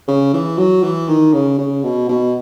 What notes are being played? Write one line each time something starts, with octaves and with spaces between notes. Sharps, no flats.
C#3
E3
F#3
E3
D#3
C#3
C#3
B2
B2